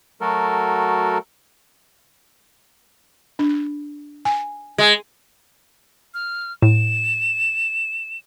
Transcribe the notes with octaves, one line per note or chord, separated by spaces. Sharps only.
F#3 A3 F#4 A4 A#4
D4
G#5
G#3
F6
A2 E7